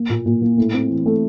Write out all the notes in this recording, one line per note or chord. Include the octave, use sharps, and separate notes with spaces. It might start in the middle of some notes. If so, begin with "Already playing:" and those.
Already playing: A#3
A#2
A#2
A#3
A2
C4
E3
A3